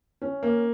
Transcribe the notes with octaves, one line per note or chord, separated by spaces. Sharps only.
C#4
A#3